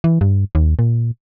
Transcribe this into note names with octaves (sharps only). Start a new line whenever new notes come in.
E3
G2
D#2
A#2